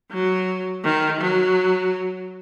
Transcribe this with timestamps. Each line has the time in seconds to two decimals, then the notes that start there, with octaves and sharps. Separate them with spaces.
0.12 F#3
0.84 D#3
1.21 F#3